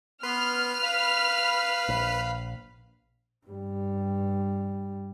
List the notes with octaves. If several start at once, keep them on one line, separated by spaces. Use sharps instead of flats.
B3 B4 C6 F6
F5 B5
A#1
G2 G3